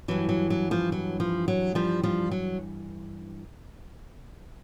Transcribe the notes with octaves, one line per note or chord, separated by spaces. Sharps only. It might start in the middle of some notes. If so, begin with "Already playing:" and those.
G2 E3 F#3
F#3
F#3
F3
F#3
F3
F#3
F3 G3
F3 G3
F#3